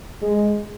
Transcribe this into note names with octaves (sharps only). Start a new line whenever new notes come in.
G#3